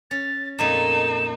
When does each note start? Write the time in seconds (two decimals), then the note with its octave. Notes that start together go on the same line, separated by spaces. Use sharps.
0.11 C#4 A6
0.59 F2 A#2 A3 D#4 E7